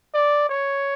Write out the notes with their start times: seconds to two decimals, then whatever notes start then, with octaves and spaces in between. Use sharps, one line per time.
0.14 D5
0.50 C#5